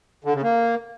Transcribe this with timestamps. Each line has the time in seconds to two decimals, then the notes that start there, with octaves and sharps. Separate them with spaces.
0.24 D3
0.34 C#3
0.43 A#3